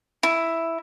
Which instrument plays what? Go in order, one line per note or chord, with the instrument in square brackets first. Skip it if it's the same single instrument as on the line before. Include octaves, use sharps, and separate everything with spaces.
[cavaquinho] E4